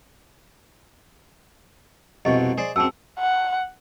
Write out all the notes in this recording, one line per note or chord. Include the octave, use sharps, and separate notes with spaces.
C2 F2 B2 D#5 C#6
G#4 C5 D5
F#2 C4 G#4 A5 E6
F#5